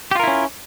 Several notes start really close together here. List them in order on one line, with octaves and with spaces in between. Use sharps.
G4 F4 A#4 E4 C#4